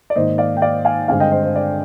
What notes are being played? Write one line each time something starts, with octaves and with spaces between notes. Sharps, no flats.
D5
G#2 D#3 A#3 C5 D#5
D5 F5
G5
D5 F5
F5 G#5
G2 D3 G#3 C4 F5 G#5
D#5 G5
C5 D#5
C5
D5